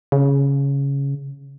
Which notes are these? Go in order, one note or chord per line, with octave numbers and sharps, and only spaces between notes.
C#3